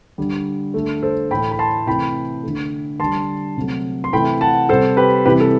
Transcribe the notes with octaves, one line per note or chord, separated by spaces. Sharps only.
D3 G3
D3 A3
A4 C5
A2 E3 A3 G5 B5
B5
A5 C6
C3 E3 A3 G5 B5
D3 A3
D3 G3 A5 C6
C3 F#3 A3
C6
C3 E3 A3 G5 B5
F#5 A5
C3 G3 A4 C5
G4 B4
C3 E3 G3 G4 B4
A4